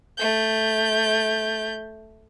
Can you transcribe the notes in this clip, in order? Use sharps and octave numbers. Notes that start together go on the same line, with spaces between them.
A3 G6